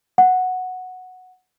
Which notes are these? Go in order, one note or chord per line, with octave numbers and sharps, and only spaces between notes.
F#5